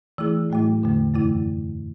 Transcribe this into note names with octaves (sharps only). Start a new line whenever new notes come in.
E3 A3 E4 G#4
A2 F#3 A3 E4
E2 D3 A3
F#2 E3 A3 E4